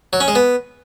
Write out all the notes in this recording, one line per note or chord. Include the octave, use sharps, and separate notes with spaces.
F#3
C#4
G#3
B3